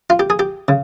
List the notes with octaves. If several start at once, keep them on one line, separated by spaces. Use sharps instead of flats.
F4
G4
G#4
G4
C#3